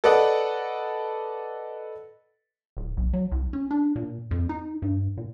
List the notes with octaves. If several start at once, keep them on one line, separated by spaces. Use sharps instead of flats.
A4 B4 D5 D#5 F#5
D1
B1
F#3
C2
C#4
D4
A#2
F2
D#4
G2
A#2